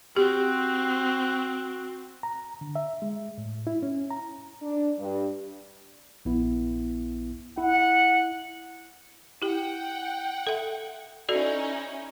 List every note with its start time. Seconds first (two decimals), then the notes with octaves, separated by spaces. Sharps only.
0.17 C4 F#4 G4
2.23 A#5
2.61 D3
2.76 E5
3.02 G#3
3.38 A2
3.67 E4
3.83 C#4
4.11 A#5
4.63 D4
4.99 G2
6.25 A#1 B3 E4
7.57 E4 F#5
9.42 E4 G4 F#5 G5
10.47 A4 E5
11.29 C#4 D#4 E4 F#4 A4 D5